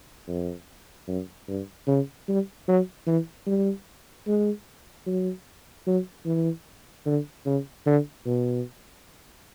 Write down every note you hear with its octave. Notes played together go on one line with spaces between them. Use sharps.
F2
F#2
G2
C#3
G3
F#3
E3
G3
G#3
F#3
F#3
E3
D3
C#3
D3
B2